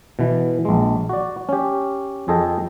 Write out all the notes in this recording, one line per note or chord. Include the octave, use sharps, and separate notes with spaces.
B2 E3
A#1 G#3
F#4 D5
C#4 G4
F2 G#4 A4 D#5 G5